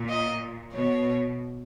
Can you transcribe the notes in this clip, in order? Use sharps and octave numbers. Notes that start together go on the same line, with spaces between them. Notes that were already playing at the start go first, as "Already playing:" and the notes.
Already playing: A#2
D#5
B2 C#5